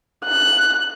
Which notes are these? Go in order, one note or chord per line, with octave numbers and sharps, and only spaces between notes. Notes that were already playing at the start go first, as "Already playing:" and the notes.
F#6